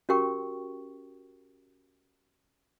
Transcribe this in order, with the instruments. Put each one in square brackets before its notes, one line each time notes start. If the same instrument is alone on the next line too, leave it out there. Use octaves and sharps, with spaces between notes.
[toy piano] C#4 F#4 G4 A#4 G5 C#6